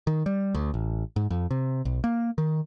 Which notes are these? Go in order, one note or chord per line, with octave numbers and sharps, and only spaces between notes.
D#3
G3
D2
A1
G#2
F2
C3
B1
A#3
D#3